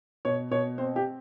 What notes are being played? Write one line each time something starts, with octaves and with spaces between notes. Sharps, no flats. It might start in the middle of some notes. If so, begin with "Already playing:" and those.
B2 C#5
B2 C#5
C4 C5
G4